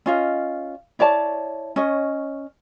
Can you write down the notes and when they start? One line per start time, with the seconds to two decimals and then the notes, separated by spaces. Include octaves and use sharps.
0.06 C#4 F4 D#5
0.99 E4 C#5 D5 A5
1.76 C#4 C#5 D#5